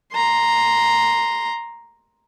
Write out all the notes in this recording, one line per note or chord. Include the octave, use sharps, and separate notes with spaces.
A#5 C6